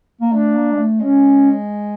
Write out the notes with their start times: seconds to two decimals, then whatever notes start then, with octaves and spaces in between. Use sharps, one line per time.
0.21 A#3
0.32 A3 D4
0.55 A#3
0.72 G#3
0.78 A3
1.01 G#3 C#4